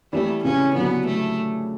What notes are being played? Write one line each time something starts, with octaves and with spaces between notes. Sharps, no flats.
E3 G3 A3
C#3 E3 C#4
D3 F#3 B3
A3